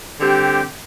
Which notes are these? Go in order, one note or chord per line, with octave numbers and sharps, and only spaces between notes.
D3 G3 C4 G4